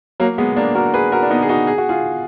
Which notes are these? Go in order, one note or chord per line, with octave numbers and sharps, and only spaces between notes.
F#3 A#3
G#3 B3
A#3 D4
F#4 A#4
G#4 B4
F#4 A#4
D4
B3 D#4
G#4
D#4 F#4
G#4
F#4
F4 G#4